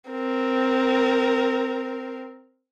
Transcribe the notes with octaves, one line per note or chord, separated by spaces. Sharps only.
C4 A#4